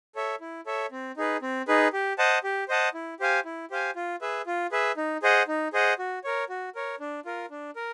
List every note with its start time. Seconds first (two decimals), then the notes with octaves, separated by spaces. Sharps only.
0.15 A4 C#5 E5
0.41 E4
0.66 A4 C#5 E5
0.92 C4
1.17 D#4 G#4 B4
1.42 C4
1.68 D#4 G#4 B4
1.93 G4
2.18 C5 D#5 F#5 A5
2.44 G4
2.68 C5 D#5 F#5 A5
2.94 E4
3.20 G4 C5 F5 G#5
3.45 E4
3.70 G4 C5 F5 G#5
3.96 F4
4.21 G#4 B4 E5
4.46 F4
4.72 G#4 B4 E5
4.97 D#4
5.23 G#4 C5 D#5 F#5
5.48 D#4
5.73 G#4 C5 D#5 F#5
5.99 F#4
6.24 A#4 C#5
6.49 F#4
6.75 A#4 C#5
7.00 D4
7.25 F4 A#4
7.50 D4
7.76 A#4